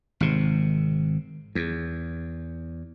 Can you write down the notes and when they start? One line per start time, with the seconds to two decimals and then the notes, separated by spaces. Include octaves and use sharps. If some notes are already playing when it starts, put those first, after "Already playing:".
0.20 G#1 C3
1.55 E2